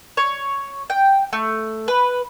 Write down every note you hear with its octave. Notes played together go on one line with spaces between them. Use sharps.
C#5
G5
A3
B4